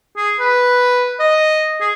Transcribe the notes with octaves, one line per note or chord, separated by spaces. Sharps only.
G#4
B4
D#5
G#4